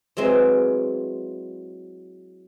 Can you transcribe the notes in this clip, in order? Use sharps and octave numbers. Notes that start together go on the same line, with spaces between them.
E3 F#3 G#3 C4